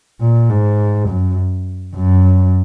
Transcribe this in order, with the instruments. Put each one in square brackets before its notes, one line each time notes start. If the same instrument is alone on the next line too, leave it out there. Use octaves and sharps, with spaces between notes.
[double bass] A#2
G#2
F#2
F#2